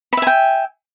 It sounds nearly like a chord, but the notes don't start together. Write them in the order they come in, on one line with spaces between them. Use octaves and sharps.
B5 E5 G#5 G5